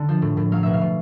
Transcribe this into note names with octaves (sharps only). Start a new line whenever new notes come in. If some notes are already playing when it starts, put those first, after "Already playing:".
Already playing: D3 A5
F3
A2
A2
F#3 F5
B2 E5
F5
B2